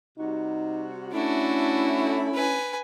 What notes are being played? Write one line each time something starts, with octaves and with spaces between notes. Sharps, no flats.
C3 G3 D#4 F#4
A3 C#4 D4 E4 F#4
B4 G#5